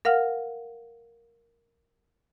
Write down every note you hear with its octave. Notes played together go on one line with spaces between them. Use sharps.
A#4 F5 F#5 F6